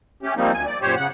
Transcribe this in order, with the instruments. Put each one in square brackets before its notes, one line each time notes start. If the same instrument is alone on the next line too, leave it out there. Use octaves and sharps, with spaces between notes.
[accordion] A3 C#4 G4
F3 G3 A#3 C4 D#4
D2 G#5
D5
F#2 A#2 G4 C5 C#5
C#3 F#5